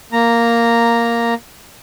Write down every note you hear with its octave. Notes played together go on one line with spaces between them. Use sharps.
A#3 A#5